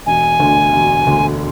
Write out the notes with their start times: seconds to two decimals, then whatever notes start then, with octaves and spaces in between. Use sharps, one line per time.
0.06 E1 G#5
0.40 D2 D3
0.73 E1
1.06 D2 D3